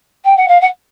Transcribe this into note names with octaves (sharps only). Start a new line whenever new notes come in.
G5
F#5
F5
F#5